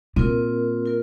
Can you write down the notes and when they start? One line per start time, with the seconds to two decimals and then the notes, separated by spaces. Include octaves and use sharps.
0.16 A#2 C4 F4 A#4
0.86 F4 A#4